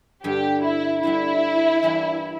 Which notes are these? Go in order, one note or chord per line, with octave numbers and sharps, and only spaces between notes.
G2 D3 G3 G4
E4
G2 D3 G3 E4
E3 G3 A#3 D4